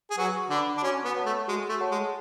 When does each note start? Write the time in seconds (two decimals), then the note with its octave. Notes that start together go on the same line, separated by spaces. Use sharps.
0.10 G#4
0.18 F#3 F#4 B4
0.50 D3 D4 F#5 B5
0.77 D4
0.82 C#4 F#4
1.05 B3
1.15 C#5 F#5 A5
1.25 A3
1.48 G#3 F#4
1.69 A3
1.80 C#5 F#5 A5
1.91 G#3